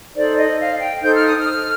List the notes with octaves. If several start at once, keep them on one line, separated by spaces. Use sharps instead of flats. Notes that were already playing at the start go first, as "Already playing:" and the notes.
D#4 A4 C5 D5
D#5
F5
G5
D#4 A4 C5 G6
F6
D#6
F6